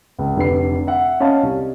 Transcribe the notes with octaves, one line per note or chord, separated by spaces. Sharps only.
C#2
F1 D3 B4 C7
E5 F#5
C#4 D#5 F5 A5
C2